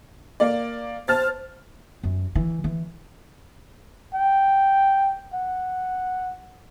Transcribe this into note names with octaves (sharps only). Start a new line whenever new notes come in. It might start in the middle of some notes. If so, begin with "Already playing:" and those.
A#3 D5
C5 A5 F6 A6
F#2
E3
E3
G5
F#5